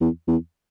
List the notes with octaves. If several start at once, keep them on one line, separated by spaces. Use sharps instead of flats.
E2
E2